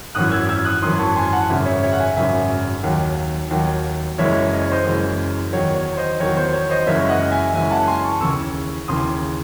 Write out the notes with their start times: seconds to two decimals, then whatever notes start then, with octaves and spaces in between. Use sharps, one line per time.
0.15 G#1 F#2 E3 D#6 F#6
0.32 E6 G#6
0.49 E6 G#6
0.65 D#6 F#6
0.82 G#1 F#2 E3 C6 D#6
0.99 A5 C#6
1.16 G#5 C6
1.32 F#5 A5
1.49 G#1 F#2 C#3 E5 G#5
1.66 C#5 E5
1.83 C#5 E5
1.93 F#5
2.00 E5 G#5
2.16 G#1 F#2 C#3 E5 G#5
2.83 D#2 D#3 F#3
3.51 D#2 D#3 F#3
4.18 F#1 F#2 E3 G#3 C#5 E5
4.52 D#5
4.61 C#5
4.72 C5 D#5
4.85 F#1 F#2 E3 G#3
5.53 E2 D#3 F#3 C#5
5.75 C#5
5.97 C5 D#5
6.20 E2 D#3 F#3 C#5
6.37 C5
6.53 C#5
6.70 C5 D#5
6.87 F#1 F#2 E3 G#3 C#5 E5
7.09 D#5 F#5
7.31 E5 G#5
7.54 F#1 F#2 E3 G#3 E5 G#5
7.71 F#5 A5
7.88 G#5 C6
8.04 A5 C#6
8.21 D#2 C#3 E3 C#6 E6
8.88 D#2 C#3 E3 C6 D#6